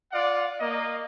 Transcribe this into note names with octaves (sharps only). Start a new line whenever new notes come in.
F4 D5 F5 F#5
A#3 D#5